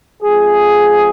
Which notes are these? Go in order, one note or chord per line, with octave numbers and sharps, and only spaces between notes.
F2 F3 G#3 G#4